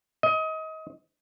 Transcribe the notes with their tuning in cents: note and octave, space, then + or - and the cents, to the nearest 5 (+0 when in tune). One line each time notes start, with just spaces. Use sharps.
D#5 +30